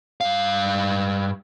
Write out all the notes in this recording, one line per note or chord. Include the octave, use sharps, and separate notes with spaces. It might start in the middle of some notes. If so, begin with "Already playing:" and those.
G2 F5